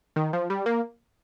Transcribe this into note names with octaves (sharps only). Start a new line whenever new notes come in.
D#3
F3
G3
A#3